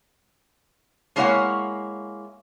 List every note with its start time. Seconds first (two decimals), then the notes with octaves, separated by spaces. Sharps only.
1.16 G#3 A#3 E4 C#5 F5 F#5